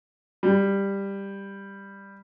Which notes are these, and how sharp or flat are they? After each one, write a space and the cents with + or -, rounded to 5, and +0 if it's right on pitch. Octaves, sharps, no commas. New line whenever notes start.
G3 +10